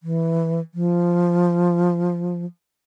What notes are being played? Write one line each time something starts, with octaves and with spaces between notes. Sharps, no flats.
E3
F3